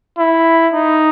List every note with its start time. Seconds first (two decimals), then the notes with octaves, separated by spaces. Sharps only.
0.18 E4
0.74 D#4